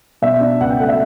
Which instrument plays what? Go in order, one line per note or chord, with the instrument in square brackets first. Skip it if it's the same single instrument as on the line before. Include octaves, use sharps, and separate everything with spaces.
[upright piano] B2 E5
D4
C#2 F#5
G5
A3 F#5
E5